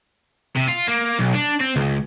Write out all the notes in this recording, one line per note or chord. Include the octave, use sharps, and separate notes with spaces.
C3
F4
A#3
B1
D4
C4
C#2